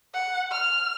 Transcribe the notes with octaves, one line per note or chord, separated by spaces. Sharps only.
F#5
F6